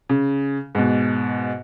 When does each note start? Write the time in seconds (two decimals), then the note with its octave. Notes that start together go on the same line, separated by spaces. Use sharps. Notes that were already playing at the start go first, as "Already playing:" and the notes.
0.09 C#3
0.75 G#2 B2